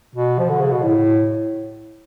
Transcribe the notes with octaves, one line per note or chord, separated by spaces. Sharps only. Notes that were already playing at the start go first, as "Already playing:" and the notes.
B2
F3
D3
C#3
B2
A2